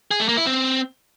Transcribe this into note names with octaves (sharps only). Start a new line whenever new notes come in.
G#4
A3
A#3
E4
C4